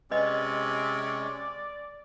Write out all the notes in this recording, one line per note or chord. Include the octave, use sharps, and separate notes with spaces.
C3 G#3 C#4 B4 D5 D#5